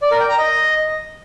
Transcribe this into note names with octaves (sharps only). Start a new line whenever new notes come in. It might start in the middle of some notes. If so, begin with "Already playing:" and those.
D5
A#4
G5
A#5
D#5